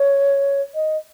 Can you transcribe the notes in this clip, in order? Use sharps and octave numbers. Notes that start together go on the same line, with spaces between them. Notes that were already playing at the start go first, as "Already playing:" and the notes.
Already playing: C#5
D#5